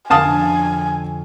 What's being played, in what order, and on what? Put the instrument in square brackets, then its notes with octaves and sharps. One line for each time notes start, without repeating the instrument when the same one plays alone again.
[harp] F2 D3 [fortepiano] F5 A5 D#6 [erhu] G#5